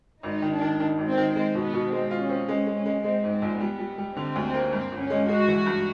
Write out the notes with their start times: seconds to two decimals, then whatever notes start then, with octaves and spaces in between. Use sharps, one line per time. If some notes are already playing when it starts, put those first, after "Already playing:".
0.23 G#1 D#4
0.42 D#3
0.51 D4
0.61 D#3
0.80 D#3
0.98 G#1
1.09 C4
1.17 D#3
1.35 G#3 C4
1.55 B2
1.63 B3
1.73 B2
1.92 G#3 C4
2.11 F4
2.20 C#4
2.30 C4
2.48 G#3 C#4
2.67 G#3
2.76 C#4
2.86 G#3
3.04 G#3 C4
3.24 G#2
3.32 C4
3.42 A#1
3.60 G3 B3
3.79 G3
3.98 G3
4.16 D3 C4
4.36 D2
4.44 C4
4.54 A#3
4.72 G2 C4
4.92 G1
5.00 C#4
5.10 G#3
5.29 G#3 F#4
5.48 E3
5.66 G2